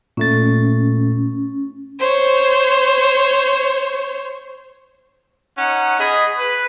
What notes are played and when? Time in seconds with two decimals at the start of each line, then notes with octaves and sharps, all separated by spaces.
0.17 A#2 A3 C#4 A6
2.00 C5 C#5
5.57 C#4 D#4 F#5
5.99 G#4 D#5 B5
6.37 B4